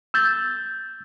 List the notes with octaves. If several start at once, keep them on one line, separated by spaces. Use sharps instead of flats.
E6 G6 A6